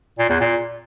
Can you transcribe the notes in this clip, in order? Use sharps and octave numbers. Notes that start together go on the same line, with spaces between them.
A#2
E2
A#2